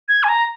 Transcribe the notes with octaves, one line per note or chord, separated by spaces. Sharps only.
G#6
G#5
A#5